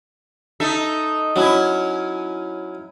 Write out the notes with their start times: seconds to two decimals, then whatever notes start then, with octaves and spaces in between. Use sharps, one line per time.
0.60 D#4 A4 E5
1.36 F#3 C#4 E4